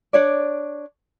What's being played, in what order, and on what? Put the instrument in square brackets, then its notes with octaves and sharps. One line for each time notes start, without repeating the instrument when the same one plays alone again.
[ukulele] D4 C#5 D5